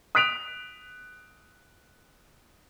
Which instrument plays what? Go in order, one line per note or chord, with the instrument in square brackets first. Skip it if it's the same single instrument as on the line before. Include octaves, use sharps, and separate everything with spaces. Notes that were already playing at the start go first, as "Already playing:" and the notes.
[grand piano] D#6 F#6 B6 D7 F7